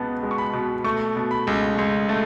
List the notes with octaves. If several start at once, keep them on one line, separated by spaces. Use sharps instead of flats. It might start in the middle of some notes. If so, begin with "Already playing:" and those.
Already playing: C#2 B2 B3 A5
G#3
C#6
B5
B2
A3 C#6
B2
B5
C#2
C#2
A3